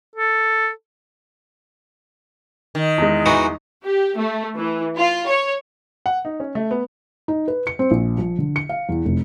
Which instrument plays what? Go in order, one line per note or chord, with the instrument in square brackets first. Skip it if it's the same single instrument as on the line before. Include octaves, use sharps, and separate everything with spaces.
[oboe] A4
[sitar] D#3
[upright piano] E2 G#3
[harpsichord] E3 D#4 F#4
[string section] G4
A3
E3
F4
C#5
[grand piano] F#5
D#4
C#4
A3
B3
[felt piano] D#4
B4
C#7
C4
A#1
F3
D3
C#7
F5
E2
F1